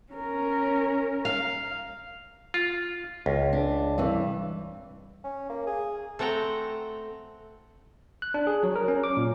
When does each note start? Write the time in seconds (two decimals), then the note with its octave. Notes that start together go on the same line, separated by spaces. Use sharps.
0.13 C#4 A#4
1.25 F5
2.54 F4
3.26 C#2
3.53 D4
3.98 G2 C3 E3
5.24 C#4
5.49 A#3
5.67 G#4
6.19 A3 C4 F#5 G5 A#5
8.22 F#6
8.34 D4
8.47 G#4
8.63 F#3
8.76 A#4
8.88 C#4
9.04 D6
9.17 A#2